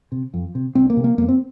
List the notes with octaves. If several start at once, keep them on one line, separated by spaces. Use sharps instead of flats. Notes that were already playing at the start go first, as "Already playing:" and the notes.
C3
F2
C3
C2 C4
A#3
C3
A#3
F2 A#3
C4